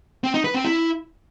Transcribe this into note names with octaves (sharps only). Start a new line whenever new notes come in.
C4
D#4
B4
C4
E4